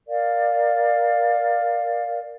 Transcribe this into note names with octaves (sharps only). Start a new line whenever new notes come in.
A#4 D5 F5